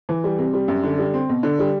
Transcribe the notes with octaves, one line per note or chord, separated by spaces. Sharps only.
E3
G3
C3
G3
F#2
D3
G3
C4
B2
D3
G3